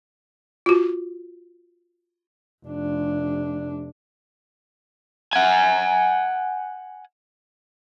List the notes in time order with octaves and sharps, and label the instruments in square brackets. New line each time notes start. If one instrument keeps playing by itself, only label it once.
[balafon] F4 F#4
[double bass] F1 D4
[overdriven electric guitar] F#5 G#5